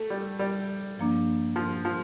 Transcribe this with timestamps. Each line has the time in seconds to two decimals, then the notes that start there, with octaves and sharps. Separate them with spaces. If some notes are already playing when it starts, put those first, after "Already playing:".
Already playing: A3
0.10 G3
0.39 G3
0.98 G2 F3 A#3 D4
1.56 F3
1.85 F3